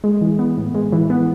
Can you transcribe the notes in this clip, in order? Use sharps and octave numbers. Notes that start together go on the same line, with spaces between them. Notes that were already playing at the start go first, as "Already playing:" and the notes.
G#3
E3
B3
A2
G#3
E3
B3